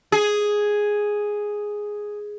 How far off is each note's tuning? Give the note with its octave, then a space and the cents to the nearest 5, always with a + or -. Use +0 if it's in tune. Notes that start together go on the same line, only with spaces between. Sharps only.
G#4 +0